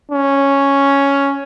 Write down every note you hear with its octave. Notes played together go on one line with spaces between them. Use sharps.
C#4